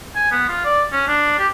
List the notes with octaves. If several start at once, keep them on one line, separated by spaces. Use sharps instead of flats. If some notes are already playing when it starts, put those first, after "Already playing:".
G#5
B3
F4
D5
C#4
D4
G4